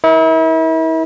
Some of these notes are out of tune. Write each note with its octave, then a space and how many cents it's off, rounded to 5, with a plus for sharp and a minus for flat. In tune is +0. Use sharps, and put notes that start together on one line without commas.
E4 -40 A#4 +30